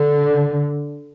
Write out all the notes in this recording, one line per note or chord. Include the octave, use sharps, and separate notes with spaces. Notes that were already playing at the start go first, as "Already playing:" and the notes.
Already playing: D3